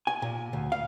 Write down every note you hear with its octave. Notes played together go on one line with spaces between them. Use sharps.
G#5
A#2
D2
F5